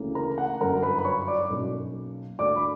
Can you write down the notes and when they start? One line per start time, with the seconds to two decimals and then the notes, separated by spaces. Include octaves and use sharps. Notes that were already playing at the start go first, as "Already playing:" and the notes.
Already playing: D2 C#3 E3 A#3
0.15 A#4 A#5
0.38 F#5
0.61 G1 F#2 D3 A#4 A#5
0.82 B4 B5
0.98 B5
1.05 C#5 C#6
1.28 D5 D6
1.50 B1 B2 A#3 C#4
2.39 D2 D3 A#3 D4 D5 D6
2.56 B5